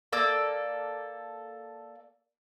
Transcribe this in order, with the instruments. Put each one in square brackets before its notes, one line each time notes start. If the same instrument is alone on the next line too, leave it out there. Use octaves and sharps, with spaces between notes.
[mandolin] A#3 A4 D5 E6